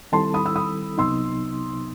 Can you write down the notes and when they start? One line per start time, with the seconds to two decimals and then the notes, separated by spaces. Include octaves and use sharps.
0.12 D#3 G3 C4 E4 A4 A5 C6
0.34 B5 D#6
0.46 E6
0.56 B5 D#6
0.98 C2 C3 F#3 B3 D#4 C6 E6